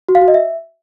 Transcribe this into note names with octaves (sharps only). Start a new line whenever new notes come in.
F#4
F5
F#4
D#5
E5